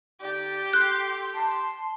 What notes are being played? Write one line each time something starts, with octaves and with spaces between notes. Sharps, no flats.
D3 D#4 G4 D5
A4 C6 F#6
A5 C6